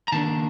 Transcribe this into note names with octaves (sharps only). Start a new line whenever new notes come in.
A#5
D#3 A#3 D4 A5